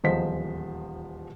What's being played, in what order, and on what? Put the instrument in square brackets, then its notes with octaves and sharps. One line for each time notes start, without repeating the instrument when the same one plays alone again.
[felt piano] D#1 E2 F3 C5 D#5 B6